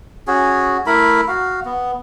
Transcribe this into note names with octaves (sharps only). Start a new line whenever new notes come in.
C#4 F#4 G#4
A3 E4 A#4 B5
F#4 F5
B3